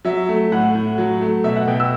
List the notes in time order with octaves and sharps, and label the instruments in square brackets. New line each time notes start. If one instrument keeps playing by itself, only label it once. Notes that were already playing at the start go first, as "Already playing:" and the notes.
[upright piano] F#3 E5
A3
A2 F#5
A2
F#3
A3
B2 E5
F#5
B2 G5
E6